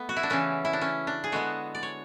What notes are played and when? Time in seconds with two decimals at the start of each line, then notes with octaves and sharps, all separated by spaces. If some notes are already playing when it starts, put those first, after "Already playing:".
Already playing: A3 B3
0.09 F#4
0.16 E4
0.23 D4
0.30 C#3 E3 B3 C#4
0.65 E4
0.73 D4
0.81 C#4
1.07 D4
1.24 G#4
1.32 D3 G#3 B3 F#4
1.75 D5
1.83 C#5